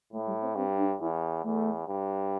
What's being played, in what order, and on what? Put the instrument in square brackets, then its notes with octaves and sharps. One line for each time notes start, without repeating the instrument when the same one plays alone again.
[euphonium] A2 [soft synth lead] A3
[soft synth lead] G3
C4
[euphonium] G2 [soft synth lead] C4
[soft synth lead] D4
[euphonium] E2 [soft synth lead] E4
[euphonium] E2 [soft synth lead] A3
[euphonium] G2